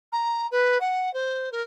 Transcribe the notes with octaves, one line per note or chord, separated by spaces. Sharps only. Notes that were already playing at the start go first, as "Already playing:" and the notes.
A#5
B4
F#5
C5
A#4